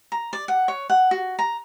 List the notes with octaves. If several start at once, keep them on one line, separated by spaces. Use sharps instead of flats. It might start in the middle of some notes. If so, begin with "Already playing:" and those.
A#5
D5
F#5
C#5
F#5
F#4
A#5